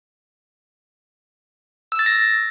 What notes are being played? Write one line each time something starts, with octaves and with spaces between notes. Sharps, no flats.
E6
A6
A#6